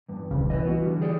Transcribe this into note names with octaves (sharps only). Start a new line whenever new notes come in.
E2 G2
D#1 C2 C#3
E3 B4 C5 D#5
B3 F#4
D3 G3
G4 G#4 D5